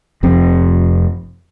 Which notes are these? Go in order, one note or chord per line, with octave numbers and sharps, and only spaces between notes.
F1 F2 C4